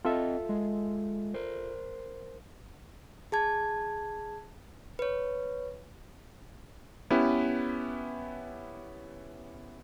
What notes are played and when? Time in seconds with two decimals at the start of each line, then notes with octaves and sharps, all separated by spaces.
0.05 C4 F4 A4 D#5 E5
0.49 G#3
1.34 A#4 C5
3.32 G#4 A5 G#6
4.99 B4 C#5
7.10 B3 C#4 E4 G4 B4